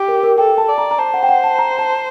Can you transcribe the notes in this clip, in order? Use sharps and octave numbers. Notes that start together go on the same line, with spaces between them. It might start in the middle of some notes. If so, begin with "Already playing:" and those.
Already playing: G4
A#4
A#4
A4 G5
A5
D5
A#5
A#5
C5 A5
F#5
G5
F#5
A5
A#5
A5